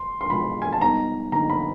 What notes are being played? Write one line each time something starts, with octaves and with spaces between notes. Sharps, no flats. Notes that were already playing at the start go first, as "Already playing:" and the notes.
Already playing: C6
C6
B2 G#3 C4 F4 B5
G#5
A5
G3 B3 D#4 A#5
D3 F#3 A#3 D#4 A#5
B5